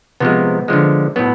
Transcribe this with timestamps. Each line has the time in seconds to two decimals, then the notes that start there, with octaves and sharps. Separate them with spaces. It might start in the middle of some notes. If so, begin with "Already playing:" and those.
0.20 C3 F3 G#3 B3
0.68 D3 F3 G#3
1.16 A2 F#3 B3